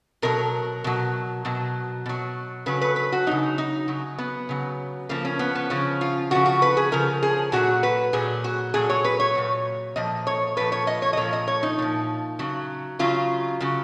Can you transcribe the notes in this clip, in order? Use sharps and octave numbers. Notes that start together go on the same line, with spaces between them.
B2 F#3 A#4
B2 F#3
B2 F#3
B2 F#3
C#3 F#3 B4
B4
B4
F#4
C#3 F#3 D#4
D#4
C#3 F#3
B3
C#3 F#3
C#3 F3 A#3
C#4
B3
B3
C#3 F3 C#4
F4
C#3 F3 F#4
F#4
B4
G#4
C#3 F3 A#4
G#4
A#2 F#3 F#4
B4
A#2 F#3 G#4
F#4
A#2 F#3 G#4
C#5
B4
C#5
A#2 F#3
A#2 F3 D#5
C#5
A#2 F3 B4
C#5
D#5
C#5
D#5
A#2 F3 C#5
D#5
C#5
D#4
A#2 F3
C#3 F#3
C#3 F#3 F4
C#3 F#3